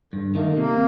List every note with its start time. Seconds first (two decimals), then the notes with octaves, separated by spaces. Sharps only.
0.13 G2 D3
0.35 D#3 A3 A#3
0.56 C3 A#3